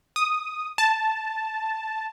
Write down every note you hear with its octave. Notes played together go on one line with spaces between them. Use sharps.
D#6
A5